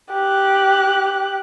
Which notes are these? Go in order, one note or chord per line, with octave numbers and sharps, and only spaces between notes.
G4 F#6